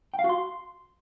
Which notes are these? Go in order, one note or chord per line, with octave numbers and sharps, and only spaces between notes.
G5
F5
F#4
C6